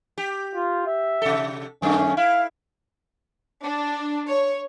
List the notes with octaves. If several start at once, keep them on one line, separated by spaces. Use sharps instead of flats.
G4
F4
E5
C3 A4
F#2 D#3 A3 C#4
E4 F5
D4
C#5